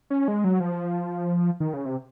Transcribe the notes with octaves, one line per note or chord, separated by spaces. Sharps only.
C#4
G#3
F#3
F3
D#3
C#3
C3